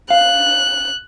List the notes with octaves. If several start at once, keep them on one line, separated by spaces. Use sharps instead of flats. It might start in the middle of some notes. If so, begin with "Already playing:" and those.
F5 F#6